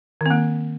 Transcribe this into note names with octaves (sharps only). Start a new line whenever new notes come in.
D#3 A#3 C4